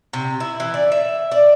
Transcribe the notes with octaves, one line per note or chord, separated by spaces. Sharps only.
C3
E4
E3
D5
E5
D5